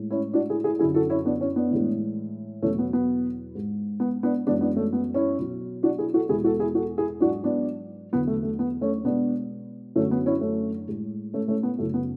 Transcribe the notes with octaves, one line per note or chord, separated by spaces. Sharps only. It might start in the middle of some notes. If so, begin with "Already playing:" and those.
Already playing: A2 G#3
C#4 E4
D4 F#4
E4 G#4
E4 G#4
F#2 D3 F#3 E4 G#4
F#4 A4
C#4 E4
B3 D4
C#4 E4
B3 D4
A2 E3 G#3
E2 B2 F#3 A3 C#4
B3
B3
G#2 G#3
B3
B3 D4
F#2 E3 G#3 B3 D4
B3 D4
A3 C#4
B3
C#4 E4
B2 F#3
D4 F#4
E4 G#4
F#4 A4
E2 B2 G#3 E4 G#4
F#4 A4
E4 G#4
F#4 A4
E4 G#4
G#2 F#3 D4 F#4
B3 D4
E2 D3 F#3 B3
A3
A3
B3
A3 C#4
B2 G#3 B3 D4
F#2 D3 F#3 A3 C#4
B3
C#4 E4
A3 C#4
A2 G#3
A3 C#4
A3 C#4
B3
F#2 C#3 F#3 A3
B3